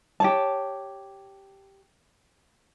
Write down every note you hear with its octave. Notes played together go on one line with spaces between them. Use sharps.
G4 C#5 A5